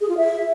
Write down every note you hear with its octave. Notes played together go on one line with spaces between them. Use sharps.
G#4
F4
E5